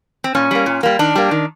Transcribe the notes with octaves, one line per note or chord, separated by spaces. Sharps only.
C4
A#2 C#4
G3 A#3
A#2
G3 A#3
D#3 D4
G3 A#3
D#3